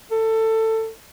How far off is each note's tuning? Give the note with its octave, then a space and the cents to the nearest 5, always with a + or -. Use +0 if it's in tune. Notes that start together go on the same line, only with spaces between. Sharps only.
A4 +20